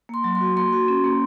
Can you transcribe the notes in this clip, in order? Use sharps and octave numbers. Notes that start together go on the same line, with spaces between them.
A#3 C6
F#3
C6
F#4
A#3 C6
F#4
C#4
A#3